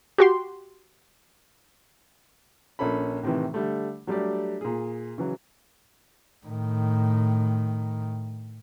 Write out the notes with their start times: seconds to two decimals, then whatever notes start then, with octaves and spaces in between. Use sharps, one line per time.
0.18 F#4 G4 C6
2.79 A#1 A#2 C#4 A4 B5
3.23 A2 C3 D#3 E3
3.54 D3 G3 A3
4.07 F#3 G3 A3 D4 G4 D5
4.61 A#2 G#4
5.18 C#3 E3 F#3
6.47 A2 D#3